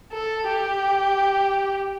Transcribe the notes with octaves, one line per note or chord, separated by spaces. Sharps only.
A4
G4